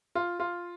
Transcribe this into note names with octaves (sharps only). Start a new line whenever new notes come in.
F4
F4